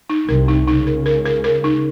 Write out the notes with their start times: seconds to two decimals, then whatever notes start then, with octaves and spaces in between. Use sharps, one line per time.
0.10 D#4
0.28 C2 C3 A#4
0.48 D#4
0.67 C#2 C#3 D#4
0.87 A#4
1.06 A#4
1.25 A#4
1.44 A#4
1.64 D#4